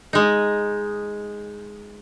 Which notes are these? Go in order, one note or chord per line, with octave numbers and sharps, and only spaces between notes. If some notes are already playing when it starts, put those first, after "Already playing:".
G#3 D#4